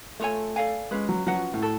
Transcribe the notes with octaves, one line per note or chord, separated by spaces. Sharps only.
A3 F4 A4 C#5 G#5
A4 D5 F5 G#5
G#3 C#4 F4 B4
F#3
F#3 C#4 F#4 B4 F#5
F3
A2
F#4 A4